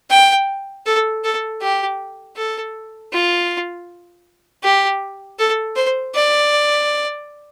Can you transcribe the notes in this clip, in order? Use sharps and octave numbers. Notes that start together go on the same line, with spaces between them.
G5
A4
A4
G4
A4
F4
G4
A4
C5
D5